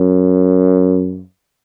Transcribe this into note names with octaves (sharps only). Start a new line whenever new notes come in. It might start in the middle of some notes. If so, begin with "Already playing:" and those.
Already playing: F#2